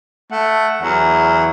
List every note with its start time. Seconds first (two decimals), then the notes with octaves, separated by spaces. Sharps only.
0.31 A3 F#5
0.82 E2 F#3